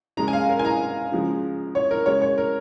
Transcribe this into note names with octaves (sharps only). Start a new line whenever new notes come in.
C#3 G#3 A#5
G#5
F5
A#4
G#5
A#5
C#3 F3 G#3
C#5
A#4
C#3 G#3 C#5
C#5
A#4